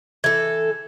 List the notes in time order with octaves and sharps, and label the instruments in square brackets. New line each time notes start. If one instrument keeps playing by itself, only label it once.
[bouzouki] E3 A4 [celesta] G#6